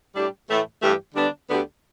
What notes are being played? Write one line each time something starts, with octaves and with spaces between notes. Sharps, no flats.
A2 G3 D4 G4
A2 E3 A3
G2 E3 A3 G4
D3 G3 B3 D4
D2 D3 B3 G4